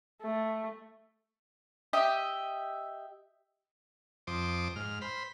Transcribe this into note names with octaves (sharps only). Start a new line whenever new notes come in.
A3
G4 D#5 E5
F2 C5 D6 D#6
G#2 F6
C5 B5